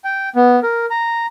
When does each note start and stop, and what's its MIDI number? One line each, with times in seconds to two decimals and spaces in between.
0.04 0.29 79
0.36 0.60 59
0.63 0.86 70
0.90 1.26 82